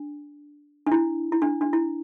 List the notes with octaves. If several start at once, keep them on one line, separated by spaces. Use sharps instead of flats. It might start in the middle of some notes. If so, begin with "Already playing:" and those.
Already playing: D4
D4
E4
E4
D4
D4
E4